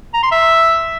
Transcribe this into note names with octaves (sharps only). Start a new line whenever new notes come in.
A#5
C6
E5